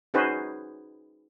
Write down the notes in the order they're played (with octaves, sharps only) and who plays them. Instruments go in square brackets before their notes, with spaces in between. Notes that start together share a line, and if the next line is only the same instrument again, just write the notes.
[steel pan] C#4 D#4 F#4 G#4 B4 C5